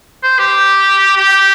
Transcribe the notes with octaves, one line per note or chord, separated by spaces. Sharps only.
C5
G4
G4